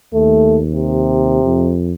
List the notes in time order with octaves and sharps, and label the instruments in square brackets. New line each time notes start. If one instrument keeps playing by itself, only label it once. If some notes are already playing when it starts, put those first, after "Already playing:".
[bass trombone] D#2 [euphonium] A3
[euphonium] C3
[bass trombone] F2